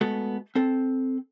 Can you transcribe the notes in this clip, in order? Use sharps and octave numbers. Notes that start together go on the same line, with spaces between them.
G#3 A3 B3 F#4 A4
C4 A4